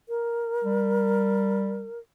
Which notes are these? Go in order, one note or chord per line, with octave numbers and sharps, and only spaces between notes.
A#4
G3